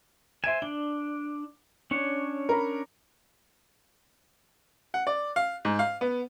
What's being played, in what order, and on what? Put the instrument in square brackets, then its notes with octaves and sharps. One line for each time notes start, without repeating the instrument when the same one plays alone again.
[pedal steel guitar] C5 G#5 [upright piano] E5 D7 E7
[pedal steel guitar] D4 [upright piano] G7
[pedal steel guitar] C#4 D4 C#5
[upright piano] A#4 A#5 B5
F#5
D5
F5
G#2
F5
B3